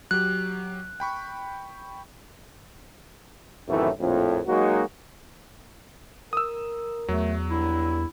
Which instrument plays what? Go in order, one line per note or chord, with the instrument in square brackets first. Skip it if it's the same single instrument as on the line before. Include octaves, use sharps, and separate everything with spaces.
[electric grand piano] F#3 G4 [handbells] F#6
[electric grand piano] G5 B5 C#6
[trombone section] F#2 A2 C3 D#3 E3 A3
A#1 F2 A2
F#3 G#3 A#3 D#4 F#4
[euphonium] A#4 [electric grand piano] D#6 E6
[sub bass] E2 [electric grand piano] F#3 [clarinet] A3
[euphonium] G2 [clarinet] E4